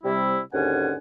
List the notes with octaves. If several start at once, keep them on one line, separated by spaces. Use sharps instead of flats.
C3 G3 E4
D#2 G#2 D3 C#4 F#5 G#5